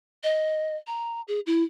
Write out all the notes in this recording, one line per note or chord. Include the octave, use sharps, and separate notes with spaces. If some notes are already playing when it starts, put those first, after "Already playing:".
D#5
A#5
G#4
E4